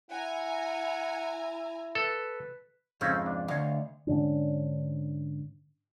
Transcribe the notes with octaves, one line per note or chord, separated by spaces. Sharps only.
E4 F#5 G#5 A#5
A4 B4
F2 G#2 C#3 C4 C#4 A4
D4
D2 C#5 D#5 F5
G#2 D3 C#4 D4